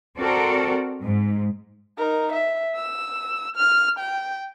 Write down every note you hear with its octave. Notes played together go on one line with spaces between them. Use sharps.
C4 F#4 A4 A#4 D5
G#2
D#4 A#4
E5
E6
F6
G5